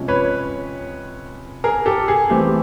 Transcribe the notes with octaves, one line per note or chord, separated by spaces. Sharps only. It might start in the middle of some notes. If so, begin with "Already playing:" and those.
Already playing: C3 F3 G#3 C#4
B4 C#5
G#4 A#4
G4 A4
G#4
E3 A3 C4 G4